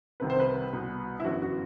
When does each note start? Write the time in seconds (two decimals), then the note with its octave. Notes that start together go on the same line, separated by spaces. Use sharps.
0.20 C2 C3 D#3 B4
0.30 C5
0.40 B4
0.73 C2 B2
1.20 E4
1.24 G1 F#2 E3 F#4
1.42 F#4